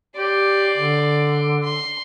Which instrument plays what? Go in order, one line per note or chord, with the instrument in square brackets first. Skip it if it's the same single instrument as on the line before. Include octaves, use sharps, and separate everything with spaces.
[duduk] G4 [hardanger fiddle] D5 C6
[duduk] D3
[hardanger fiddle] C6